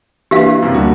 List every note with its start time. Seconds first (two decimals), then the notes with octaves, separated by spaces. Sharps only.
0.31 E3 A#3 D4 G4 B4 F5
0.62 F#2 C3
0.74 D2 G3 A#3 D4 F#4